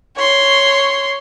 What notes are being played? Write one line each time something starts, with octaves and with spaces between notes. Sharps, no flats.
C#5 C6